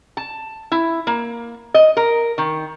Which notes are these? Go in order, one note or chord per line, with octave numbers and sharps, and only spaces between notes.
A5
E4
A#3
D#5
A#4
D#3